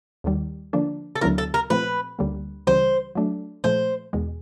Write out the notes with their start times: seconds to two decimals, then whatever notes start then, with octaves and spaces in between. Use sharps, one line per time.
0.24 D#2 D#3 G3
0.73 D3 F3 A#3 D4
1.15 A4
1.21 D2 D3 F#3 B3 E4 A#4
1.38 A4
1.54 A#4
1.70 A#2 F3 A3 C4 B4
2.19 D2 D3 G3 A#3
2.67 C#2 C#3 E3 G3 C5
3.15 F#3 A3 D4
3.64 A#2 F3 A3 C5
4.13 E2 B2 G#3